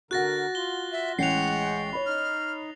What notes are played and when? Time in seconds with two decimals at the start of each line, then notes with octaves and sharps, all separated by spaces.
0.11 D3 F#4 A#4 F#5 F#6 A6 A#6
0.55 F4 G7
0.92 E5
1.19 A1 G#3 C#5 F#5 G5 C7 F7
1.93 C#5 B5
2.06 D#4 F6